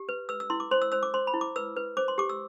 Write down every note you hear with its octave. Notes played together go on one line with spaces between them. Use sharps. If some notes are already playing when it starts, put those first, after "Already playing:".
Already playing: G4
B4
B4 E6
E6
E4 C6
D6
C5 C6
E6
C5 E6
D6
C5 C6
B5
E4
D6
B4 E6
B4
C5 D6
C6
G4 D6
E6